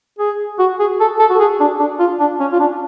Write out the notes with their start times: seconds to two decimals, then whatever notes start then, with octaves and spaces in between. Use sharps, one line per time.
0.19 G#4
0.59 F#4
0.79 G#4
1.00 A4
1.19 A4
1.30 F#4
1.39 G#4
1.60 D4
1.79 D4
1.99 F4
2.20 D4
2.40 C#4
2.52 F4
2.60 D4